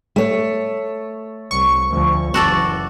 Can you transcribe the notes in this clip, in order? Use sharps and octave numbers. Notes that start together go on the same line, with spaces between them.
A3 C#5
C2 C#6
D2 F3
F#1 E3 F#4 A4 D5